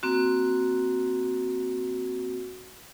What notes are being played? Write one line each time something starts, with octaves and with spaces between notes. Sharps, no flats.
A#3 C4 F#4